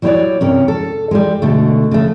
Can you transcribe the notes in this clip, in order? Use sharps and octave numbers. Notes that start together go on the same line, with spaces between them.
F#3 G3 E4 B4 C#5 D5
G2 C3 C#4 A#4
A4
G3 G#3
B2 D3 A3
C#3 A3